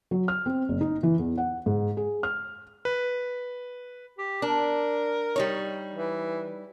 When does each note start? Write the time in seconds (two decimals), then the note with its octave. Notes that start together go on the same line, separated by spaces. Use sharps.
0.11 F#3
0.28 F6
0.46 C4
0.69 F#1
0.81 D#4
1.03 E3
1.19 E2
1.38 F#5
1.66 G#2
1.97 G#4
2.23 F6
2.85 B4
4.18 G4
4.42 D4 A#4
5.36 G3 D#4 C#5
5.95 E3